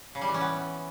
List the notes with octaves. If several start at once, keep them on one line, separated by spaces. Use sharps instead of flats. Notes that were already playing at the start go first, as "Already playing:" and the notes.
C#3
G3
E3
C#4
B3